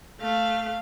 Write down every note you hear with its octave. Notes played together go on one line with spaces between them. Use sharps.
A3 F5